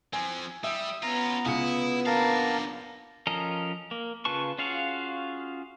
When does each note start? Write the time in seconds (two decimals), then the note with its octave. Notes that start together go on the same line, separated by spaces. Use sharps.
0.13 F3 C4 G#5
0.64 G3 E5 D#6 E6
1.03 B3 C#4 F4 A#5
1.46 C#2 E4 D#6 C#7
2.06 A#3 D4 A#4 F5 A5
3.27 F3 C#4 A4 A#4 D#5
3.91 A#3
4.25 C#3 F4 B4 A5 C#6
4.58 C#4 F4 F#4 G#4 F5